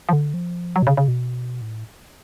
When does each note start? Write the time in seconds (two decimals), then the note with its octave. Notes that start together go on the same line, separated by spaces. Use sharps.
0.09 F3
0.13 D3
0.34 F3
0.76 F#3
0.82 B2
0.87 C#3
0.97 C#3
1.08 B2
1.61 A2